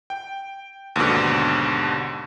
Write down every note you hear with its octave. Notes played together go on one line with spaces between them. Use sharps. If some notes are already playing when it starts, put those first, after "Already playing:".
G5
D#2 G#2 B2 D3